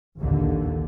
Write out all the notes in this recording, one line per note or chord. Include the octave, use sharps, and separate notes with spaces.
A#1 D#2 D3